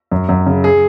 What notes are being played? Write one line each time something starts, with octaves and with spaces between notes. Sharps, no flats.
F#2
F#2
C#3
G#4